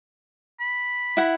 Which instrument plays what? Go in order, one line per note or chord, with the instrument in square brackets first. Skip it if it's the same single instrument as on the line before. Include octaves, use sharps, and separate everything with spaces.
[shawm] B5
[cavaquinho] E4 F#5